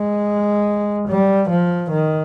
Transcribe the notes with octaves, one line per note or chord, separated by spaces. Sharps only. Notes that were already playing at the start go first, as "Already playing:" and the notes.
Already playing: G#3
G3
F3
D#3